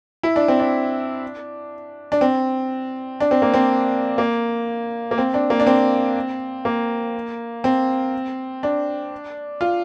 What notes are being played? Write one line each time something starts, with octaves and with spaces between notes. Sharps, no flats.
E4
D4
C4
D4
D4
C4
D4
C4
A#3
C4
A#3
A#3
C4
D4
A#3
D4
C4
A#3
C4
D4
F4